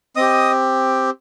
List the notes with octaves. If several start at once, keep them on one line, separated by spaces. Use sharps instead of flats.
C4 G4 D#5 D#6